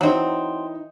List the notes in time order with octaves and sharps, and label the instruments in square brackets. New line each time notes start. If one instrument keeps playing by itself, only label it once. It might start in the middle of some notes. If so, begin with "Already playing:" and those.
[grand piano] E3 D#4 [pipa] F#3 C4